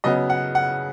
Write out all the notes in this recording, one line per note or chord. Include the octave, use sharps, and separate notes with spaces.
C#3 F#3 B3 D#5
F#5
F#5